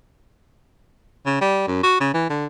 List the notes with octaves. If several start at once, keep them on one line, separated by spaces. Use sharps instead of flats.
C#3
G3
F#2
F#4
C#3
E3
D3